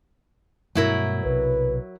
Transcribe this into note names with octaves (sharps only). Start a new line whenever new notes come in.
G2 B2 F#3 A3 E4 A#4
B1 C3 B4